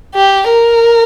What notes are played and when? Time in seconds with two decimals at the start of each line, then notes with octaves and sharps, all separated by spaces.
0.15 G4
0.48 A#4